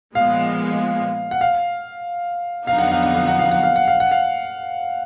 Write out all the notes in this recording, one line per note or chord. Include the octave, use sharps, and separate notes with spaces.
A#2 F3 G#3 B3 F5
F#5
F5
F2 D3 F#3 B3 D#4 F5
F#5
F5
F#5
F5
F#5
F5
F#5
F5
F#5
F5
F#5
F5